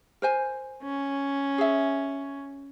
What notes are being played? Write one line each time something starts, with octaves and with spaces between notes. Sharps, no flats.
A#4 C5 G#5
C#4
G#4 E5